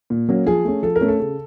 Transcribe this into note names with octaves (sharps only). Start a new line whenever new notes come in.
A#2
F#3 A#3 C#4
F3 G#4
A3 C#4
F3 A4
A#4
A3 C#4
A4
C#3